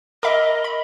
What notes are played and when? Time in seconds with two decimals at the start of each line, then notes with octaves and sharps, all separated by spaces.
0.23 A#4 D#5 E5 B5 D6
0.64 B5